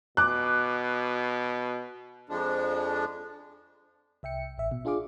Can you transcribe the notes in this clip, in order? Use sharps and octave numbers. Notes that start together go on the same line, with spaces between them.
B2 D6 F#6
F2 F3 G#3 D4
C2 E5 G5 C#7
A1 E5
B2
D4 F4 G#4 F5 D6